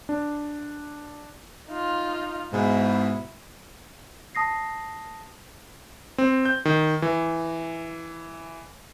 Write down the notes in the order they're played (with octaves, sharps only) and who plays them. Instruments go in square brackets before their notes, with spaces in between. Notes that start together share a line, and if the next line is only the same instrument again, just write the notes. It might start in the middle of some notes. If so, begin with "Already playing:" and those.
[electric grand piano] D4
[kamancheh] D#4 F4
[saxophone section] G#2 B2 [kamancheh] E4
[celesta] A5 D#6 A#6 C7
[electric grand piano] C4
G6
D#3
E3